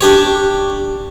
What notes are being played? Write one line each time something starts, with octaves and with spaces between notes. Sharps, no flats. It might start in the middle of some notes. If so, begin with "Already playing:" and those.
D4 G4 C#5